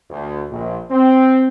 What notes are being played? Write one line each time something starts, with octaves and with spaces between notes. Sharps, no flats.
D2
A#1
C4